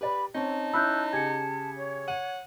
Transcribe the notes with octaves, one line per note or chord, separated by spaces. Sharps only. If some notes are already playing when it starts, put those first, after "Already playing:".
G4 B4 D5 B5
C4 C#4 D#4 C#5 A5
C#4 E4 B5 E6 F#6 G6
C#3 G4 G#5 G#6 C#7
C#5
F#5 D#7